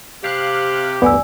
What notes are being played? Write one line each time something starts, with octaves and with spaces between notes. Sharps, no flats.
C3 G4 F5 F#6
A1 D2 G2 B3 D5 G#5 E6